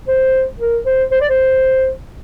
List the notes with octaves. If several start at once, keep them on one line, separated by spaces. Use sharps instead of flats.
C5
A#4
C5
C5
D5
C5